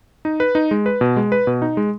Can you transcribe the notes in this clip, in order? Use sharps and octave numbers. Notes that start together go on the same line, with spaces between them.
D#4
B4
D#4
G#3
B4
B2
G#3
B4
B2
D#4
G#3